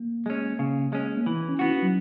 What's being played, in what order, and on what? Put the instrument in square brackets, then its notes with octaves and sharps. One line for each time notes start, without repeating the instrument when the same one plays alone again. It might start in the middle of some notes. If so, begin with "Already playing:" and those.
Already playing: [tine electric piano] A#3
[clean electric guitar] G#3 C#4
C#3
G#3 C#4
[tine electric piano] A#3
[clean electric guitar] E3 [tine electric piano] B3
[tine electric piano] C#4
[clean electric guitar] B3 F#4 [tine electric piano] E4
[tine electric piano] D#4
F#3